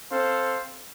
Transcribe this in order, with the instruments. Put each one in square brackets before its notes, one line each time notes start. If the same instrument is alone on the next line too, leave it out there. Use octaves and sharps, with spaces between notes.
[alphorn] C4 [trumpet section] A4 C5 F5